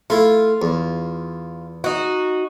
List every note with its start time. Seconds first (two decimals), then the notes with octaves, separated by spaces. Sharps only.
0.10 A3 E4 F4
0.62 E2
1.84 D#4 F#4